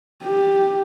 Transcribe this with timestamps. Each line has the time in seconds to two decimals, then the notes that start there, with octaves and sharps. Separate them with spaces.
0.24 G4